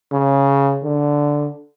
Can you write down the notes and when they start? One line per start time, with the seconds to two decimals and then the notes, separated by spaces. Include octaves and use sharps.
0.12 C#3
0.84 D3